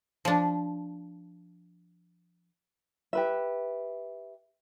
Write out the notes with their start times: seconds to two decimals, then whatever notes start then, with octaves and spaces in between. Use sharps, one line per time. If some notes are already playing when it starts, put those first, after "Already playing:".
0.25 F3 D4
3.13 G4 B4 E5